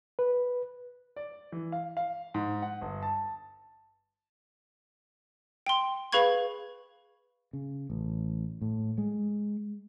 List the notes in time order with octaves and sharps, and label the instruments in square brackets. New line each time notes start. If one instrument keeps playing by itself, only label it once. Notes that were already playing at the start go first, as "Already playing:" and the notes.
[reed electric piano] B4
[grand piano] D5
E3
F5
F5
G#2
F#5
G1
A5
[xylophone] G5 C6
G#4 B4 F5 B5 C#6 G#6
[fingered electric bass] C#3
A1
A2
G#3